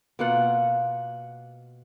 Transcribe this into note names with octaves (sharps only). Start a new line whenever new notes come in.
B2 A#3 F4 F#5